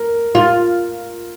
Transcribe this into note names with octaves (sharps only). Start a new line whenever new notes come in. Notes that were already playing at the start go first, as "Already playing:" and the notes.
Already playing: A#4
F4